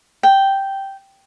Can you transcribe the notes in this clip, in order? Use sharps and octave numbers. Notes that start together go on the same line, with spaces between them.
G5